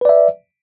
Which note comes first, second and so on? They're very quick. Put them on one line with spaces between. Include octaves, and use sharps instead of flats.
B4 D5 E5